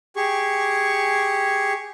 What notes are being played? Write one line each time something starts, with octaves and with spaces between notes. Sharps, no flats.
G4 G#4 C#6